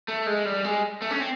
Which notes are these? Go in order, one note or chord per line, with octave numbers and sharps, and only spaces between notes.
A3
G#3
G3
G#3
A3
C#4
C4